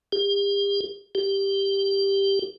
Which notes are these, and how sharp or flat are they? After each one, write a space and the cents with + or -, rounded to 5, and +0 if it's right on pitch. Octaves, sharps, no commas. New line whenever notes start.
G4 +40
G4 +5